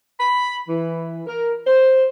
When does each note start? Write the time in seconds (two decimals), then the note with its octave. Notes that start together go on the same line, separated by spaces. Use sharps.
0.20 B5
0.68 E3
1.27 A#4
1.67 C5